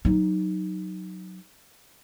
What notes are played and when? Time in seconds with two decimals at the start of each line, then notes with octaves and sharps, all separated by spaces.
0.05 F#3 D#4